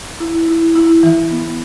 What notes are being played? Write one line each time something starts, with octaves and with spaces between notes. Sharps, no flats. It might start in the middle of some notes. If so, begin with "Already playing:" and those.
E4
E4
E4
E3
B3